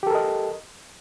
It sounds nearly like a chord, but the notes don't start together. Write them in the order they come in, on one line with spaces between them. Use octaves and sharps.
G4 A4 A#4 D#5